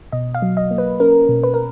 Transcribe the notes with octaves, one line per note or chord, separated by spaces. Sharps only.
B2 D#5
F5
F#3
D#5
A#3
B4
C#4 A#4
B2
B4
A#4